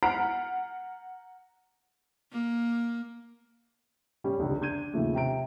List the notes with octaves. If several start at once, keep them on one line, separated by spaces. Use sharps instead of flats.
F#5 A#5 F6 B6 C7 D7
A#3
G3 C#4 G4
F1 C#2 D3
D4 G6 G#6 D#7
D#2 C#3 F3 A3
C3 G5 A#5 D7